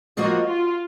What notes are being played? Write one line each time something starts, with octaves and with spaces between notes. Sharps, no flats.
F3 A#3 F4 F#4 G#4 D#5
F4